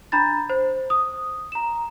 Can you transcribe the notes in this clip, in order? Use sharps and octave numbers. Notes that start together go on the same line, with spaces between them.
D4 A#5 B5 A6
C5
D#6
A#5 E7